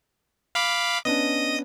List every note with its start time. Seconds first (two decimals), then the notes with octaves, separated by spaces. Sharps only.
0.55 F5 B5 D6
1.05 B3 C#4 D4 D#5 D#6